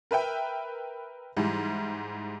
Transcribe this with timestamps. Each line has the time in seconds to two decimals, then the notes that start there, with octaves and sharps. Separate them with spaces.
0.11 A#4 B4 E5 G5
1.37 G#2 E3 G3